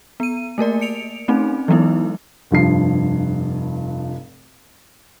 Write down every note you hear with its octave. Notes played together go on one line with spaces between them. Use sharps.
B3 D#7
A3 A#3 A#4 D5
C#7 D7 F7
A3 C4 C#4 D#4
E3 F#3 G#3 B3 D#4 E4
F1 G2 F3 C7